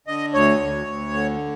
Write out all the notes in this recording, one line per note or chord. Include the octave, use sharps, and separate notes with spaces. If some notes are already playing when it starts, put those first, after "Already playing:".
D3 D#5
D2 C#5
D2
D2
D3